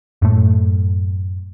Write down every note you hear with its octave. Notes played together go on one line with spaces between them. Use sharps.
F#2 A2 A3